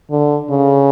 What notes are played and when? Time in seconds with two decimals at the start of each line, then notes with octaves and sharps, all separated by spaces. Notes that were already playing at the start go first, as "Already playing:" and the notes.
0.11 D3
0.50 C#3